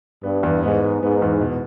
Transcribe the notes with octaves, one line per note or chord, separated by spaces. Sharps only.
G2 B3
E2
G#2 B3
B3
G#2 B3
E2
B2